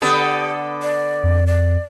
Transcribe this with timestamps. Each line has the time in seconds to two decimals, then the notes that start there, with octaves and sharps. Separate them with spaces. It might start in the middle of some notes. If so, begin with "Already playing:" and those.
0.02 D3 B3 G4 A4
0.82 D5
1.23 F2
1.47 D5